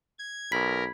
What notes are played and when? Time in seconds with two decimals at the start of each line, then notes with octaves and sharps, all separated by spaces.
0.19 G#6
0.52 B1 A#4 B5 G#6 B6